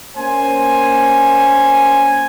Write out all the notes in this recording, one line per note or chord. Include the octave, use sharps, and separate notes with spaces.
A#3 C#4 C5 G#5